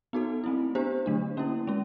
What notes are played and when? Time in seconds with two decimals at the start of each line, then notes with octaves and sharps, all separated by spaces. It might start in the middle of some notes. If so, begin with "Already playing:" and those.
0.13 B3 D#4 F#4 A4
0.44 A3 C4 E4
0.75 B3 D4 G4 C5
1.06 D3 F#3 A3 D4
1.37 A#3 C#4 E4
1.67 G#3 C#4